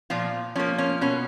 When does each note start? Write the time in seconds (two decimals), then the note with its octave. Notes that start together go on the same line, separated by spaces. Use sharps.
0.10 A#2 F3 F4
0.56 F3 A#3 C#4
0.78 C#4
1.01 B2 C#4